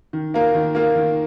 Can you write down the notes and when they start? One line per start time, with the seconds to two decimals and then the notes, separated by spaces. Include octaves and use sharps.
0.13 D#3
0.34 A#3 F4 A#4
0.54 D#3
0.75 A#3 F4 A#4
0.95 D#3